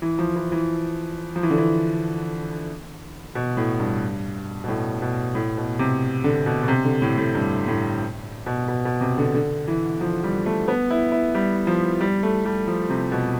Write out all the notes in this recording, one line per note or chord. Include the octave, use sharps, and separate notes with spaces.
E3
F3
E3
E3
F3
E3
D3
E3
B2
A2
G2
B2
A2
B2
A2
B2
C3
D3
B2
B2
C3
D3
A2
A2
G2
A2
B2
B2
B2
C3
D3
D3
E3
F3
G3
A3
B3
E4
E4
G3
F3
G3
A3
G3
F3
C3
B2